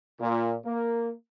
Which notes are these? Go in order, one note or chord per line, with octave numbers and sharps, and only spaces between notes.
A#2
A#3